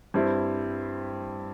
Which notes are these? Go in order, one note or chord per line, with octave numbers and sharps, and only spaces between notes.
G2 G3 C4 E4